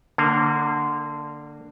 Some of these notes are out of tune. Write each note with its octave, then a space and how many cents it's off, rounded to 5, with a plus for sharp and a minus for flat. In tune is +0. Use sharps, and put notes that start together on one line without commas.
D3 +10 A#3 -25